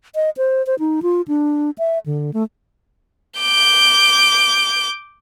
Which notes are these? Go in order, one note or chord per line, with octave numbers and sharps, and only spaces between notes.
D#5
C5
C5
D#4
F4
D4
E5
D3
A3
D6 G6